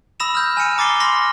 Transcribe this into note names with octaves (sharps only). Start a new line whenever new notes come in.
B5 D#6 E6 A#6 E7 F7
F6 G6
G#5 F6 C#7 D#7
A#5 D6 A6 C7 G7
B5 C6 F6 A#6